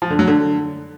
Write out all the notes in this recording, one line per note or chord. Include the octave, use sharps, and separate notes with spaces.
F3
D3
F#3
D3